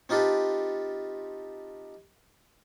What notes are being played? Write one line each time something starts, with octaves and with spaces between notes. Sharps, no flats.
C4 D#4 F4 G4 A4 B4